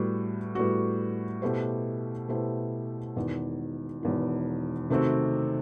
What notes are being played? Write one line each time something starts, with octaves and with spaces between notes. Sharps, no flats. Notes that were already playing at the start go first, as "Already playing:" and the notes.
Already playing: A2 G3 B3 F#4
A2 G3 B3 F#4
B2 A3 E4 G4 C5
B2 A3 E4 G4 C5
E1 E2 D#3
E1 E2 D#3
C3 D#3 A3 C4 F#4